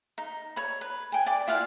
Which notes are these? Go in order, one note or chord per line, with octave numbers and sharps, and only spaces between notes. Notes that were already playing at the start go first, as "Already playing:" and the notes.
D#4
C#5 B5
B4
G5 G#5
D5 G5 D6
E4 F4 F5 F#5